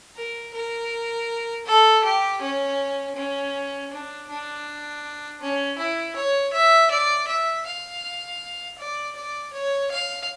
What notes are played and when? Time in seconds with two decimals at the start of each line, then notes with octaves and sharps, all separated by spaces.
0.16 A#4
0.54 A#4
1.66 A4
2.04 G4
2.41 C#4
3.16 C#4
3.91 D4
4.29 D4
5.42 C#4
5.78 E4
6.16 C#5
6.53 E5
6.91 D5
7.28 E5
7.66 F5
8.79 D5
9.16 D5
9.53 C#5
9.91 F5